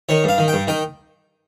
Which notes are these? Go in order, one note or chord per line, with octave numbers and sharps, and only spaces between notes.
D#3 C#5
G2 F5
D#3
G5
G2
D#3 G5